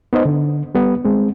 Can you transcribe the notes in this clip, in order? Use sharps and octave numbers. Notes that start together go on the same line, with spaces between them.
B3 D#4 C5 D#5
D3
G3 B3
G#3 C4